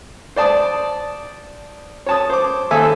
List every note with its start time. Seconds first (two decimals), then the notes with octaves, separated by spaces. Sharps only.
0.36 C5 D5 A5 D#6
2.06 C#5 A5 D#6
2.30 C5 D6
2.71 D#2 A4 E5 G#5